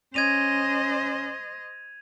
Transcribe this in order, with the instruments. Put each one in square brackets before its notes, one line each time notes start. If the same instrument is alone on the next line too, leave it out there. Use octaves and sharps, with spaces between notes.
[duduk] C#4 [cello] C5 D#5 [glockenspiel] G#6 D#7 F7